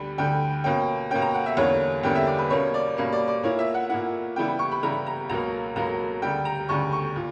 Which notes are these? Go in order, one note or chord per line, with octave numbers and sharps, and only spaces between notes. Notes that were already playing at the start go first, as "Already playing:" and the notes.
Already playing: D2 D3 G3 B5
D2 D3 G3 G5
B2 A#3 C#4 G5
B2 A#3 C#4 G5
A#5
F#5
E5
E2 D3 G3 A#3 C#4 C#5
E2 D3 G3 A#3 C#4 G5
E5
D5
B4
B2 G3 A#3 C#4 C#5
D5
B2 G3 A#3 C#4
D5
D5
A#2 A#3 E4 C#5
E5
F#5
A#2 A#3 E4 F#5
C#3 E3 G3 B3 E4 G5
B5
C#6
B5
C#3 E3 G3 B3 E4 A#5
A#5
C#2 B2 F#3 A#3 A#5
C#2 B2 F#3 A#3 A#5
D2 C#3 G3 G5
A#5
D2 C#3 G3 C#6
C#6
A#2